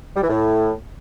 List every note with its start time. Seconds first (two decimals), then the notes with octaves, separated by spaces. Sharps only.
0.15 G3
0.22 E3
0.29 A2